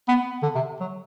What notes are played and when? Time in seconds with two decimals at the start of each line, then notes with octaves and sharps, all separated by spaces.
0.08 B3
0.43 D3
0.55 C3
0.81 F#3